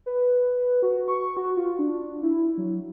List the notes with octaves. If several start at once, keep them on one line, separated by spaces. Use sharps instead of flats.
B4
F#4
C#6
F#4
F4
D4
E4
F#3